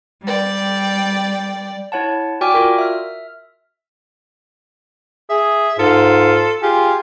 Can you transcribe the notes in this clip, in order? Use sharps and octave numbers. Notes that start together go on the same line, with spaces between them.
G3 D5 G5
E4 C#5 F#5 A5
F#4 D5 G5 G#5 D6 F6
F4 F#4 A#4
E5 F6
G#4 E5
G#2 F4 A4
F4 G4 G#4